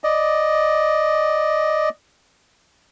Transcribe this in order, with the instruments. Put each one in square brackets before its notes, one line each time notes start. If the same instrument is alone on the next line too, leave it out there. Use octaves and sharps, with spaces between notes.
[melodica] D5 D#5